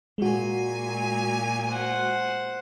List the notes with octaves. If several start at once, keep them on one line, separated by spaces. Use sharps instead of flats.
A#2 G#3 F#4 G#5
C5 F#5